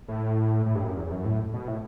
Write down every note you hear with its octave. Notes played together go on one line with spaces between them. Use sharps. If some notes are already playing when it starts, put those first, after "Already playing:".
A2
A2
G2
F#2
E2
E2
F#2
A2
B2
A2